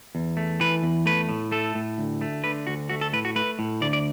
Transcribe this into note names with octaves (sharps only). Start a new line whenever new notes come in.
E2
A3
E3 B4
E2
A3 B4
A2
A3 A4
A2
D2
A3
D3 B4
D2 F#4
A3 F#4
A4
A2 B4
F#4
A3 B4
A2
D2 D5
D5